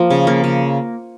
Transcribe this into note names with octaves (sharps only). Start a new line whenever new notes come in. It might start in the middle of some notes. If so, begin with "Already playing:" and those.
Already playing: F3 A#3
C#3
A#3
C#3